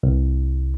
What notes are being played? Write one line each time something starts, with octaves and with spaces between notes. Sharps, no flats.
C2